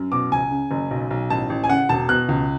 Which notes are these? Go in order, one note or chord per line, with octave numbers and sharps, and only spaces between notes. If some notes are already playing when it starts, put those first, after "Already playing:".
Already playing: F#2
B2 D6
C#2 G#5
C#3
F#1
B1
B1
A1 A5
A1
G#5
C#3 F#5
E1 A5
B2 F#6
C#2